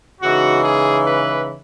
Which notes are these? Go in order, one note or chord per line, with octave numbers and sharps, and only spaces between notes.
C#3 E3 G#3 D#4 F#4
G#4
B4